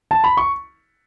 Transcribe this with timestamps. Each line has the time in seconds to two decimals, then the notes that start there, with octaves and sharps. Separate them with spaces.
0.11 A5
0.24 B5
0.37 C#6